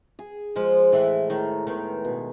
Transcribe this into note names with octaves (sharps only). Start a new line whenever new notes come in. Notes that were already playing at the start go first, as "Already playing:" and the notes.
G#4
F3 G#3
A2 E3
A2 D#3
D#3 B3
B2